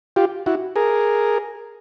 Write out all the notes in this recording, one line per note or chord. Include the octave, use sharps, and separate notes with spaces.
F4 G4
E4 F#4
G#4 A#4